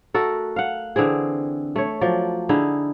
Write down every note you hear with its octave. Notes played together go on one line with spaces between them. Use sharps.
A3 F#4 A4 A#4
F5 F#5
D3 E3 C4 G#4
A3 C#5
F3 F#3 D5
D3 D#4 E4 G#4